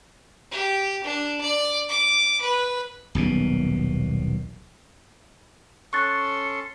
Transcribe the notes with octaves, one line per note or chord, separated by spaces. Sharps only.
G4
D4
D5
D6
B4
D#1 B1 B2
C#4 A4 C6 C#6 F#6 A6 C#7